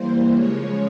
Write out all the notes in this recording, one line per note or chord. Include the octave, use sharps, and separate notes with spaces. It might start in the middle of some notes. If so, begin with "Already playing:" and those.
Already playing: E3 G3 A#3 C5
C#3 F3 G#3 C#5